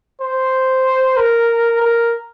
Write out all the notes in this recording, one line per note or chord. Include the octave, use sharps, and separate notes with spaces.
C5
A#4
A#4